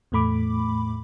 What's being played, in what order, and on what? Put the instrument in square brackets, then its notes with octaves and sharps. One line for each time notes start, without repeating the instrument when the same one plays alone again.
[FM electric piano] E2 A2 A3 B5 D6